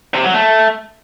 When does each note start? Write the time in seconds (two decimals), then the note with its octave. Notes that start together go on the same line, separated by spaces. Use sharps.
0.14 C3
0.24 F#3
0.34 A3